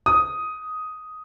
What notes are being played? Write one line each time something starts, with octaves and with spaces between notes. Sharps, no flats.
D#6